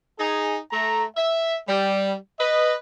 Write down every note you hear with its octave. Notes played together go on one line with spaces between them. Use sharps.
D#4 G#4
A3 A#5
E5
G3
B4 D#5